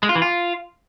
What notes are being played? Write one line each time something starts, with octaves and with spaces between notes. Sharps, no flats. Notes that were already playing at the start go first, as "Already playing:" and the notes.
G#3
F4
E3
F4